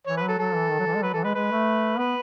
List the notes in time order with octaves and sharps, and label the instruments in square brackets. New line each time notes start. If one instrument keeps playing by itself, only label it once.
[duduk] E3 [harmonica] C#5
[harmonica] B4
[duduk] F#3
[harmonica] A4
[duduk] F#3 [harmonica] A4
[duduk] E3
D#3
F#3
E3
G#3
[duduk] F#3 [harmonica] B4
[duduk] E3 [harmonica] A4
[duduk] G#3 [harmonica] B4
[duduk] G#3 [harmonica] B4
[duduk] A3
[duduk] B3 [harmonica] B4